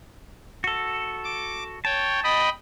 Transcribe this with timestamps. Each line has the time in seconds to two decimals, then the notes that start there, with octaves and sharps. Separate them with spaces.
0.64 F#4 A4
1.24 D6
1.85 C#5 G5 A5
2.24 D#5 G5 B5